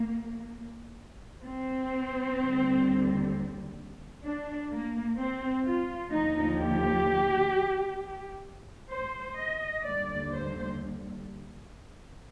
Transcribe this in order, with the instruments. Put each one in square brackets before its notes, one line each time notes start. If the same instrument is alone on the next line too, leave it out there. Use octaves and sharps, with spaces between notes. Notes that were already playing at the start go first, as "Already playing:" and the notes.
Already playing: [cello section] A#3
C4
D#2 D3 G3
D4
A#3
C4
F4
D#2 D3 F3 D#4
G4
C5
D#5
D#2 D3 G3 D5
C5